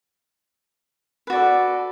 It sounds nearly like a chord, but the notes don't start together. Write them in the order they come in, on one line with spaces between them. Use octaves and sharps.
B4 F#4 D5 A4